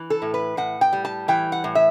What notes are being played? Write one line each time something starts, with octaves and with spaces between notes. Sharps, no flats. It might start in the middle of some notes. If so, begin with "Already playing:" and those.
Already playing: E3
A4
A2
B4
A2 F#5
G5
G3
A5
E3 G5
F#5
A2
E5